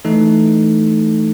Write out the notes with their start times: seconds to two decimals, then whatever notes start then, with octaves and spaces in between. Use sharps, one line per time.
0.05 E3 A3 D#4 A4